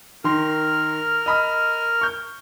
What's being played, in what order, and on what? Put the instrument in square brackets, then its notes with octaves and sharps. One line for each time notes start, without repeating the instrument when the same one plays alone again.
[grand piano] D#3 C6 [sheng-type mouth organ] A#4 F6
[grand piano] D#5 B5 D#6
C#6 G6